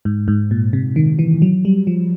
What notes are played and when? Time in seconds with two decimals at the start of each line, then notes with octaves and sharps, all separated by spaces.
0.05 G#2
0.28 G#2
0.51 A#2
0.73 C3
0.96 D#3
1.19 E3
1.42 F#3
1.65 G3
1.87 F3